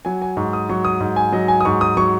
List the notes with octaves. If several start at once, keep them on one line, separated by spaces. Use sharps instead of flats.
F#3 G#5
G#5
G#2 C#6
D#6
F#3 C#6
D#6
G#2
G#5
F#3 D#5
G#5
D#6
G#2 C#6
D#6
F#3 C#6